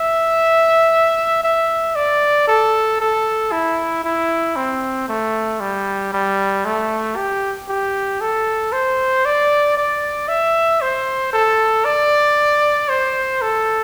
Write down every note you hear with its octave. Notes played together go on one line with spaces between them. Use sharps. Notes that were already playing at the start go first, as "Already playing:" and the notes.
Already playing: E5
E5
D5
A4
A4
E4
E4
C4
A3
G3
G3
A3
G4
G4
A4
C5
D5
D5
E5
C5
A4
D5
C5
A4